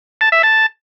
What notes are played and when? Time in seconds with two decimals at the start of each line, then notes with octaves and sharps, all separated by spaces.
0.21 A5
0.32 E5
0.43 A5